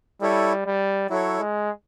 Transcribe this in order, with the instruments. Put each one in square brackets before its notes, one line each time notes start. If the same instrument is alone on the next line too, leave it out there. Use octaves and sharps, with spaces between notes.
[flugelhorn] G3 [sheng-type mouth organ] E4 A4 C#5
[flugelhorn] G3
[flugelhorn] F#3 [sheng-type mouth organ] E4 A4 C#5
[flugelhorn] G#3